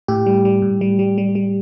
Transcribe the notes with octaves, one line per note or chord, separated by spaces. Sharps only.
A2 G4
G3
G3
A2
G3
G3
G3
G3